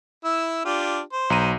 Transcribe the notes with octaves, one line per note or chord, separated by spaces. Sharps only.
E4 E6
D4 F4 G4
C5
B1 A#5 D#7